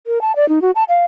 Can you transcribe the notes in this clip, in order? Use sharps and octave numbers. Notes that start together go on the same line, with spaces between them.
A#4
A5
D5
D#4
F#4
A5
F5